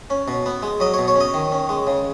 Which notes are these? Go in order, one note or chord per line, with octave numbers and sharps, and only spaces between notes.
C#4
B2
B3
G#3
F#3 D#5
B2 C#5
C#5
C#4
D#5
D#3
C#4
G#3
C#3